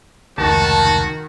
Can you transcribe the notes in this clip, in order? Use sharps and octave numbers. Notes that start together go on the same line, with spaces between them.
F1 C#2 D#3 F#4 A5